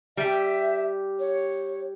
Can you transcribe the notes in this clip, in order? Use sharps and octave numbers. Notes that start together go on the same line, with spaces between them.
G3 G4 E5
C#5